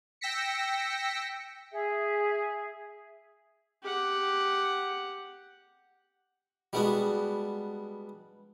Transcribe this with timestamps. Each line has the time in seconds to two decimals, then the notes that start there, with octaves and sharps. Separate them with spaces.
0.21 G5 E6 A#6 B6 C#7
1.72 G#4 E5
3.83 G4 F#5
6.73 G3 G#3 B3 D4 F#4